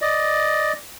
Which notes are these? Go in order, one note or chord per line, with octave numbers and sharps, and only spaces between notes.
D5 D#5